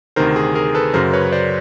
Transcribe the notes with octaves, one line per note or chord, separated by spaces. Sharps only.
D2 C3 D#3 A#4 C5
G#4
G#4 A#4
A4 B4
F#2 C#3 F#3 A#4 C5
B4 C#5
C5 D5